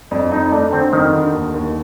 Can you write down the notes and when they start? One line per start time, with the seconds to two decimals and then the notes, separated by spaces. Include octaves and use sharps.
0.11 F2 D4
0.32 F2 D#4
0.52 A3 D4
0.72 D3 C4
0.92 F2 D#3
1.13 D3
1.33 D#2
1.54 D#2